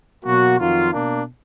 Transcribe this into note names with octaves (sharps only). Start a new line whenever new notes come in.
B2 F#3 A#3 F#4
F2 D#3 F#3 F4
B2 A#3 D4